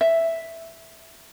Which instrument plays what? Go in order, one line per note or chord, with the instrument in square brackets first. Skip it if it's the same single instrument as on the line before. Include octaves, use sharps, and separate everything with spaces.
[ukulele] E5